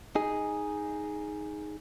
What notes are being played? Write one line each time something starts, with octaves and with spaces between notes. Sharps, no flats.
D#4 G#4